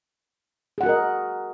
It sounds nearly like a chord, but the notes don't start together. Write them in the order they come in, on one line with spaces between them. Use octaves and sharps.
G#4 F#5 F#4 A#4 D#5